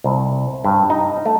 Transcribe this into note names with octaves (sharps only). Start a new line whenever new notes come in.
C2
G2
D#4
A3